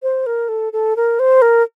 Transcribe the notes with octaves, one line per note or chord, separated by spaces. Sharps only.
C5
A#4
A4
A4
A#4
C5
A#4